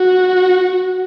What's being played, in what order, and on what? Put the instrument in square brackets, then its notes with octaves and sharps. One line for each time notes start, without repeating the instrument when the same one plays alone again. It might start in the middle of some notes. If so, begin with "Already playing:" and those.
Already playing: [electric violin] F#4